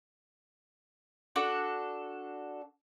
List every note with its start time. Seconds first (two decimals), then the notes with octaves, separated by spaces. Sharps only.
1.36 D4 F#4 A4